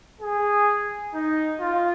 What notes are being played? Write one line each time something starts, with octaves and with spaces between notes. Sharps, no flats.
G#4
D#4
F4